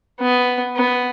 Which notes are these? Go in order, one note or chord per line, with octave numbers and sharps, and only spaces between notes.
B3
B3